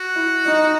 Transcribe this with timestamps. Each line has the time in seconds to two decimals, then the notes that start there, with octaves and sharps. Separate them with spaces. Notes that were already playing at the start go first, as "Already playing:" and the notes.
Already playing: F#4
0.15 E4
0.46 D#4